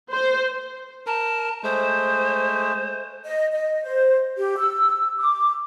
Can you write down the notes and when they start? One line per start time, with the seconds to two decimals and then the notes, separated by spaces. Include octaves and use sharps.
0.12 C5
1.07 A#4 A5
1.63 G#3 A3 C5
3.25 D#5
3.52 D#5
3.83 C5
4.37 G4
4.58 E6
5.19 D6